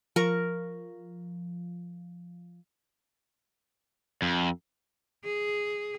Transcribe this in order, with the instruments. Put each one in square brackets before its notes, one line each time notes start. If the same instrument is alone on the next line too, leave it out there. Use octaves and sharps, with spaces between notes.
[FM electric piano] F3 [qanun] A#4 C#6
[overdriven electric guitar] F2
[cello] G#4